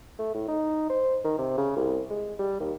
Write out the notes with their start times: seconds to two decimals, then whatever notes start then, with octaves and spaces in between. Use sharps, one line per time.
0.19 A3
0.34 A2
0.48 D#4
0.90 C5
1.24 D#3
1.38 C3
1.57 C#3
1.76 C2
2.10 G#3
2.39 G3
2.60 D#2